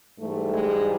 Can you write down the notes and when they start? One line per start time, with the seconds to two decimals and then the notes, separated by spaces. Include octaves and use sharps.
0.18 G#2 E3 G3 A3
0.53 G#3